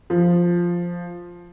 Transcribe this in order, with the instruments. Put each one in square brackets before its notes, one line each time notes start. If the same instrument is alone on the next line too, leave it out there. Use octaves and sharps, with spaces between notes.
[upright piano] F3